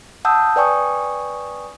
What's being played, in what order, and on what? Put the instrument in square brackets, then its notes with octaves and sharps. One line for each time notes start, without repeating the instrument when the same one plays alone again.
[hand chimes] F#5 A5 D#6 E6 G6
B4 D5 G5 G#5 C#6 D#6